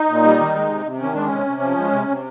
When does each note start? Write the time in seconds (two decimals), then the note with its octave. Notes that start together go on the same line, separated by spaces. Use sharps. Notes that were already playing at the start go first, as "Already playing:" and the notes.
Already playing: D#4
0.09 A#2
0.24 G3
0.40 D#3
0.54 G#3
0.69 C3
0.86 C3
1.00 D#3 C#4
1.14 G#3 D4
1.26 C#4
1.32 C3
1.46 C3
1.61 F3
1.78 G#3
1.92 C3
2.08 C3